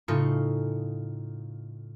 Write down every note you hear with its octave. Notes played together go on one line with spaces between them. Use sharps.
A2 C#3 D#4 F4 A4 C#6